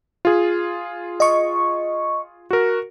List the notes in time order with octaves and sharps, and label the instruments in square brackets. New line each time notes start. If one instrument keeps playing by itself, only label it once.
[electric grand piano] F4 G#4
[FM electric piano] D#5 C#6
[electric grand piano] F#4 A#4